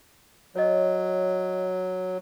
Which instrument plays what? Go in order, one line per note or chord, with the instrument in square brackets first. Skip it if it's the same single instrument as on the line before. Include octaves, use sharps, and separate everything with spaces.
[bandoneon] F#3 [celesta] C#5 D#5